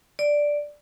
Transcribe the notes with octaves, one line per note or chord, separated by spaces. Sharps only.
D5